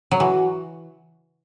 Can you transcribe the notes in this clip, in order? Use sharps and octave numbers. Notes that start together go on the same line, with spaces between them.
F#3
E3 F#4